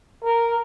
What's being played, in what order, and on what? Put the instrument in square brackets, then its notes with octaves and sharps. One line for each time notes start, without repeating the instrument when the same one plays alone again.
[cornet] A#4